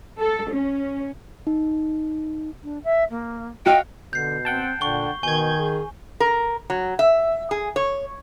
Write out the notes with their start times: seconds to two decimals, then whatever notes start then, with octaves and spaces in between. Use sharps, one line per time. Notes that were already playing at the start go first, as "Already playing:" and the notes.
0.19 A4
0.51 C#4
1.47 D#4
2.63 D4
2.84 E5
3.10 A#3
3.66 F#4 D#5 F5 G5
4.13 B2 D3 G6 C7
4.45 C4 F#5 G5 A5
4.81 A#2 D3 C#6 G7
5.23 B2 D#3 G#5 G6 G#6
5.60 G#4
6.20 A#4
6.70 F#3
6.99 E5
7.51 G#4
7.76 C#5